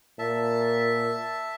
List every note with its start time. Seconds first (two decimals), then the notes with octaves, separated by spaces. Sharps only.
0.19 A#2 E5 A5